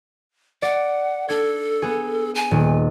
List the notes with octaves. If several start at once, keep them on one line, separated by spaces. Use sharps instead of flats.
D5 F#5
D4 A4 G#6
B3 G#4
G#5
D#1